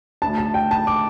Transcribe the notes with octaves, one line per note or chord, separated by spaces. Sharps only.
D2 D3 A3 A5
A5
G5
A5
D6